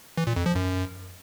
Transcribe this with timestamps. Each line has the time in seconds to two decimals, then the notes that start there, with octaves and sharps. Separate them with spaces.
0.18 E3
0.27 A#2
0.36 F2
0.46 F3
0.55 F#2